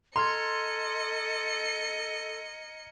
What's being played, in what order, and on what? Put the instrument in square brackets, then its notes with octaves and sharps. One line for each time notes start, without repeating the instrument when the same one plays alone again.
[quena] A4 [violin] D#5 C#7 [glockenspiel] A#5 F6 G#6 [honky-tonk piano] C6